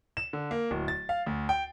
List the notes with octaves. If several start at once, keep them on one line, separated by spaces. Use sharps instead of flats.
E7
D3
A#3
D1
A6
F5
D2
G5